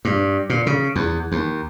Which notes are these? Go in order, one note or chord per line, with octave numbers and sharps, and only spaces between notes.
G2
A#2
C#3
E2
D#2